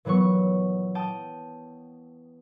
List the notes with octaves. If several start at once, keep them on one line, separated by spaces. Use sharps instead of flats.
A#2 E3 F#3 B3 C#6
G5 A5 D#6